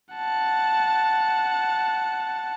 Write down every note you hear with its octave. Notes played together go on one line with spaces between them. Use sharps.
F#5 A5